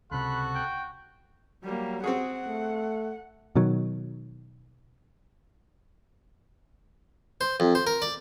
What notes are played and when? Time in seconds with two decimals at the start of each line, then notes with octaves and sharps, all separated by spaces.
0.11 C#2 C3 F#4 A4 B5 F#6
0.55 G5
1.64 F#3 G3 A#3
2.04 C4 F#4 G#4 F#5
2.47 A3
3.55 B2 D#3 F#3
7.41 C5
7.60 F2
7.75 C5
7.87 A#4
8.02 D5